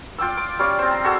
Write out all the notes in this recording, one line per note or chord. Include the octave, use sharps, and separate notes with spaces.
F4 G5 D6 E6
D6
G3 C#4 D5 F5
C4 C5
A#5
F#4 G#4 A4 E6